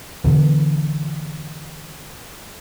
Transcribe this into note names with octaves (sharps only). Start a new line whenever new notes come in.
E2 B2 D3 E3